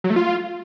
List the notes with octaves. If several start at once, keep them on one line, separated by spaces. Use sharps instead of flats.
F#3
A3
F4